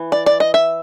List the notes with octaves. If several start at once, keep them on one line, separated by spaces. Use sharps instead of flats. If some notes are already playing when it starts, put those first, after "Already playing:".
Already playing: E3
D5
D5
D#5
E5